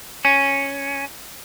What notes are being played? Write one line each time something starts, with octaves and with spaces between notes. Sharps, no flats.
C#4